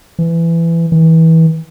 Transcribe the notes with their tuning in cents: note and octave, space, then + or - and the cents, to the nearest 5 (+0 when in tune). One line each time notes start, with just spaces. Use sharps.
E3 +20
E3 -25